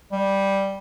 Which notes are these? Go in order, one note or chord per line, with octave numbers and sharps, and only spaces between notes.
G3